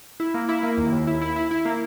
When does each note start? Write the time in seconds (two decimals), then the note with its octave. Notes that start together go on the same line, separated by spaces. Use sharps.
0.20 E4
0.34 A#3
0.49 E4
0.63 A#3
0.78 D#2
0.92 D#2
1.07 E4
1.21 E4
1.36 E4
1.51 E4
1.65 A#3